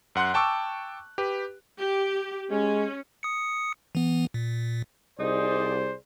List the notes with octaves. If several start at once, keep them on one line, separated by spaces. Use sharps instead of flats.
F#2 F#5 C6 F#6
G5 A5 C#6 D6 E6
G4 B4
G4
G#3 C#4
D#6 C#7
E3 B3
A#2
C2 D#4 G#4 C5 D5